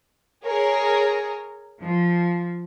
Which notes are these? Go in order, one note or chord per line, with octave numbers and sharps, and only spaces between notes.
G#4 A#4 C#5
F3